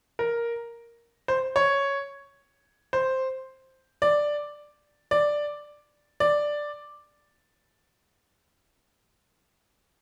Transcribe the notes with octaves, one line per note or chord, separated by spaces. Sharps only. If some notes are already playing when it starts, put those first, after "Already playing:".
A#4
C5
C#5
C5
D5
D5
D5